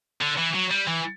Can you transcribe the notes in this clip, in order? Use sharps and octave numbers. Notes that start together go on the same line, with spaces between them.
D3
E3
F#3
G3
E3